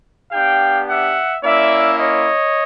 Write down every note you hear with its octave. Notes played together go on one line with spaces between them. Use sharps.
B3 D4 G4 F5 G5
E5 F#5
A#3 C#4 E4 D5 E5
C#5 D#5